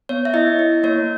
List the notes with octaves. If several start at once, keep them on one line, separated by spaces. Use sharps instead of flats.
B3 C#5
E5
E4 D#5
E4
A#3 C#5